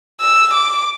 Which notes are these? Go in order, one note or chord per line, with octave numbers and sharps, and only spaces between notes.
E6
D6